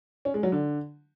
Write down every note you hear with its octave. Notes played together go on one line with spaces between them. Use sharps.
C#4
G#3
F#3
D3